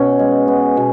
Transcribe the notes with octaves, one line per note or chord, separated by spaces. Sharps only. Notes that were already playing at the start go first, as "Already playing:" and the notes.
Already playing: B2 C#4
G#3
B3
B2